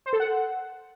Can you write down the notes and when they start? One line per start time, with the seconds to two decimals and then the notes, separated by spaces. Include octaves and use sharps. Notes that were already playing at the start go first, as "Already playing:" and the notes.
0.06 C5
0.13 A4
0.20 F#5